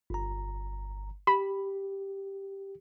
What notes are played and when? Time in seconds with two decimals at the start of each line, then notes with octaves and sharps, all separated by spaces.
0.10 G1 A#5
1.27 G4 B5